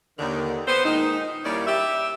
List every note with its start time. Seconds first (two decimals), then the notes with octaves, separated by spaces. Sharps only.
0.19 D#2 D3 D#3
0.68 B3 C5
0.85 A#2 D#3 G#3 D#4
1.45 D#2 G3 A#3 C#4 E4 D5
1.67 G4 E5